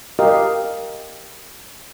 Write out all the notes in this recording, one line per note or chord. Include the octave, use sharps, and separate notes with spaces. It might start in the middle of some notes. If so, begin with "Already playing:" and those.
G4 A#4 D#5 F5